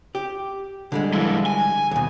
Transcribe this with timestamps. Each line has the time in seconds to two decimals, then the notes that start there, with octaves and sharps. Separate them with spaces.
0.15 G4
0.92 D3 G3 G#3
1.14 F3 E4
1.46 G#5
1.91 D#2 B2